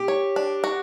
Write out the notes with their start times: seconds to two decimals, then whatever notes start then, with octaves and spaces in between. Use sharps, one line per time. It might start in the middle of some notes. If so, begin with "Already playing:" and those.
Already playing: G4
0.08 C#5
0.36 D4
0.64 F#4